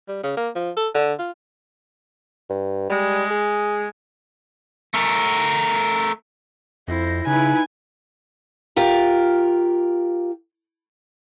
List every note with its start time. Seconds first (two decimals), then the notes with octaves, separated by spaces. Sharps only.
0.08 G3
0.23 C#3
0.37 A#3
0.55 F3
0.77 A4
0.94 D3
1.19 F4
2.50 G2
2.89 G3 G#3
3.30 G#4
4.94 A3 A#4
6.88 F2 E4 C5 A#6
7.27 C#3 D#4 E4 B4 G#5
8.76 F4 G4 A#4